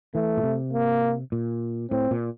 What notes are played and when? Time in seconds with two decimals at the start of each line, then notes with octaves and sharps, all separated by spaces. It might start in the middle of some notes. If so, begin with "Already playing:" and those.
0.15 E3 A3
0.37 A#2
0.43 C3
0.73 A#3
1.32 A#2
1.91 A2 C4
2.11 A#2